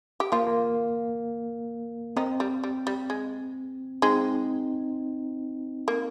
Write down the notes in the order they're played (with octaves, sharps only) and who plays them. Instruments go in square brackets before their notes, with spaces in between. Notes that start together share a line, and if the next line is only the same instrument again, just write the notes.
[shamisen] G4
[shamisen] F3 F4 [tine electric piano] A#3
[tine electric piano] A#3
[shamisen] D#3 D#4 [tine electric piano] C4
[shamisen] G3
G3
G3
G#3
[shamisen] G#3 [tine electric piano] C4 D#4
[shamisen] A#3